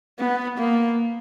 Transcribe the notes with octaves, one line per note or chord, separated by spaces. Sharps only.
B3
A#3